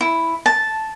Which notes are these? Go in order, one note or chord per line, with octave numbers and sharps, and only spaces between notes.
E4
A5